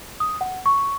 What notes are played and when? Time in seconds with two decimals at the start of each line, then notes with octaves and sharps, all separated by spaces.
0.20 D#6
0.41 F#5
0.66 C#6